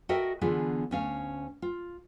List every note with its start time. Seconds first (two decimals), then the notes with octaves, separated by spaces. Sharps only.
0.09 F#4 A4 A#4 D#5 E5 G5
0.41 D3 E3 B3 D4 F4 G#4
0.91 D2 C#4 F5
1.62 F4